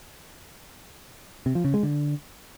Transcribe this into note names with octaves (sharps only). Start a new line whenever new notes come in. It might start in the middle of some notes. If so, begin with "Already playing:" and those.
C3
F3
C#3
G#3
D3